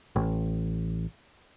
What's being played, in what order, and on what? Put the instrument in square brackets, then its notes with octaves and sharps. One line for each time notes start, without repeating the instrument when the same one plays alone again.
[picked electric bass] A1